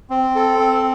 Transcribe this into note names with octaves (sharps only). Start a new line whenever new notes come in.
C4
A4
C4